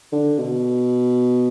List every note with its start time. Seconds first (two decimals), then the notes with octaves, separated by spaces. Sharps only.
0.12 D3
0.38 B2